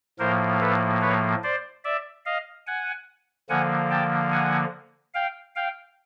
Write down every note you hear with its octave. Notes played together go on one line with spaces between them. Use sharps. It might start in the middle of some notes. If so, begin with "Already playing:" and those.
A2 F3 A#3 A#4 C5
A4 B4
B4 C#5
C5 D5
D5 E5
D#5 F5
F#5 G#5
D3 F3 A#3 F#5 G#5
G5 A5
F#5 G#5
F5 G5
F5 G5